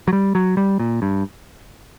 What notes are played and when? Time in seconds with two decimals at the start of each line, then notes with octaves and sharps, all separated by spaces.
0.08 F#3
0.13 G3
0.35 F#3
0.57 G3
0.79 A#2
1.02 G2